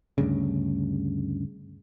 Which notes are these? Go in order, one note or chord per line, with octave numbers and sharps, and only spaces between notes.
D2 G2 C#3